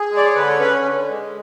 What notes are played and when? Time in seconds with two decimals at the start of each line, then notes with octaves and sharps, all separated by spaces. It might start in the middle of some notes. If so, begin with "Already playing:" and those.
Already playing: G#4
0.11 G#3
0.17 D5
0.25 C#5
0.35 D3 B4
0.48 C#5
0.60 C#4 B4
0.85 D3
1.09 G#3